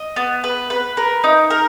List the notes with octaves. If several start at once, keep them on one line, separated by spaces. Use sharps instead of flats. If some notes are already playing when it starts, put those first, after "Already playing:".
Already playing: D#5
B3
B4
B4
A#4
D#4
A#4